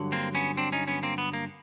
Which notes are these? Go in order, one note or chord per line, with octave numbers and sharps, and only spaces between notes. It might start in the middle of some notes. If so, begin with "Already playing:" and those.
Already playing: G2 D3 F#3
A#3 C4
B3 C#4
C4 D4
C#4 D#4
B3 C#4
A#3 C4
B3
A#3